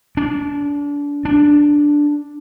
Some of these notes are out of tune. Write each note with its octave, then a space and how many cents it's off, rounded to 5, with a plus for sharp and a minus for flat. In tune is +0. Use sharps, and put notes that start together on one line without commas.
D4 -30
D4 +0